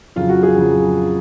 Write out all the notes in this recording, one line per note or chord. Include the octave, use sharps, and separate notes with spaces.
F2 C#3 F#3 F4
F#4
G#4
F2 C#3 F#3